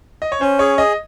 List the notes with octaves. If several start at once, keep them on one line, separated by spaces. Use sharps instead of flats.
D#5
C#5
C#4 C5
G#4 C#5
G#4 D#5